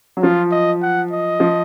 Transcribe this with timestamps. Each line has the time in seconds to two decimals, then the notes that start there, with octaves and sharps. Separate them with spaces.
0.17 F#3
0.23 F3 F4
0.52 D#5
0.82 F#5
1.11 D#5
1.40 F3